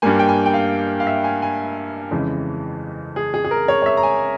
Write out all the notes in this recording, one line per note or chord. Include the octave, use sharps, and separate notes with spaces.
G2 G3 A#3 G#5
G5
G#5
G5
F5
F5
E5
G#5
G#5
F2 C#3 E3 G#3
G#4
G#4
G#4
A#4
C#5
C#5
E5
A#5
G#5